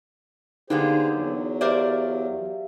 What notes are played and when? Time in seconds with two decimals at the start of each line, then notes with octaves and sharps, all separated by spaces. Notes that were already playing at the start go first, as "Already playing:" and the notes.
0.70 D3 A#3 B3 D#4 G4 G#4 C5
1.14 E2 F#3
1.61 G4 A#4 C5 D5 E5 F5